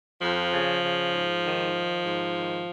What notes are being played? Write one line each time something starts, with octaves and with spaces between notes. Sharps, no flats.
F2 F3
C#3
C#3
G#2
D#3
D#3
G#2
D#3